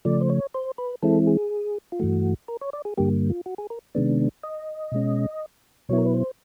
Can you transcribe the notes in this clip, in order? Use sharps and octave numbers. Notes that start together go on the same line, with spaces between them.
C#3 F3 A3 D5
C5
C#5
C5
B4
E3 G#3 C4 E4 A4
G#4
F4
G2 E3 A3 F#4
A#4
C#5
D5
G#4
G2 D3 G3 A#3 G4
F4
F#4
G#4
A#4
C3 D#3 G#3 B3 D4
D#5
B2 G#3 C#4
B2 F#3 B3 E4 C#5
A#4
B4
C5